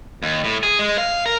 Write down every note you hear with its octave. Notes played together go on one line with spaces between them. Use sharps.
D#2
A2
G#4
G#3
F5
A#4